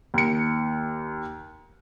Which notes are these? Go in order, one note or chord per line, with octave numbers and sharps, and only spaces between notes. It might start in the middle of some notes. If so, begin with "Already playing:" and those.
D#2 C#7